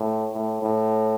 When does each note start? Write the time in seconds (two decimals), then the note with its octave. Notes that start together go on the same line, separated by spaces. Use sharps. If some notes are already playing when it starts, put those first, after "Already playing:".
Already playing: A2
0.34 A2
0.62 A2